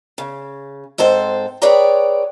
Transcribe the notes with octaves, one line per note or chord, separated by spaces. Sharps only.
C#3
G#2 C4 A4 C5
G#4 B4 C#5 D5 G5 A#5